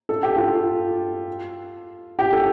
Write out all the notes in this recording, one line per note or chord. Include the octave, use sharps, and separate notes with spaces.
A4
G4
F4 A4
G4
A4